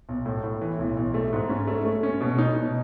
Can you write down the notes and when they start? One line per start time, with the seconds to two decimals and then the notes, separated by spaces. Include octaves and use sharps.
0.09 B1
0.26 A2
0.44 A2
0.61 E3
0.79 B1
0.97 B1
1.14 A3
1.33 G#2
1.50 C#4
1.67 A3
1.85 A3
2.03 C#4
2.21 B2
2.38 D#4
2.57 B2